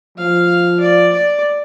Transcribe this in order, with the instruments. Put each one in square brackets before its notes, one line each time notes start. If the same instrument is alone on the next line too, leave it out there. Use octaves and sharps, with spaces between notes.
[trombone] F3 [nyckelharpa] F5
[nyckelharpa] D5
D5